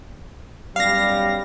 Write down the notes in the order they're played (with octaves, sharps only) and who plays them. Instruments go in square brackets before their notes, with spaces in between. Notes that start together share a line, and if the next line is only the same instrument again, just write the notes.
[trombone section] B1 F#2 G3 [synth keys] F5 A#6